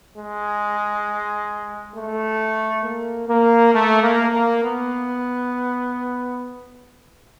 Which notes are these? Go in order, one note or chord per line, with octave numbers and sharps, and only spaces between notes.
G#3
A3
A#3
A#3
A3
A#3
A#3
B3